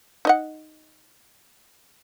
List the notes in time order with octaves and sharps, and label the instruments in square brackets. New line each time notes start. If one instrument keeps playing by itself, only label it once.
[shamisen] D#4 D#5 F#5